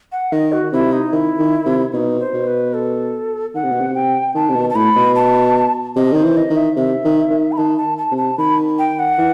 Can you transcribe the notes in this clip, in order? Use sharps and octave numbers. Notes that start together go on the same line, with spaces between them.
F#5
D#3 D#5
F#4
C3 E4
D#4
D#3 E4
D#3
C3
B2 D#4
C5
B2
B4
A4
D#3 F#5
C3
B2
C3
G5
D#3 A5
C3
B2
A5
A2 B5
B2
A5
C3 D#5
D#3 C5
E3
D#5
D#3
E5
C3 E5
D#3
D#3
B5
D#3 A5
A5
A5
C3
A5
D#3 B5
G5
F#5
E3